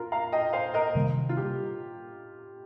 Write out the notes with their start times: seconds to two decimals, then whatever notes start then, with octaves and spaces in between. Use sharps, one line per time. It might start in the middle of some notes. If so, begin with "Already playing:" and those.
Already playing: F4 A#4
0.12 F5 A#5
0.32 D#5 G5
0.53 C5 F5
0.74 A#4 D#5
0.95 C3 D#3 G3 A#3
1.29 F4
1.37 G4